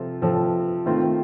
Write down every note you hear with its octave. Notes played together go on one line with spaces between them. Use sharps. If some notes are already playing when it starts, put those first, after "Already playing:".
Already playing: C3 F3 C4 F4 A4
C3 F3 C4 F4 A4
D#3 A3 C4 F4 C5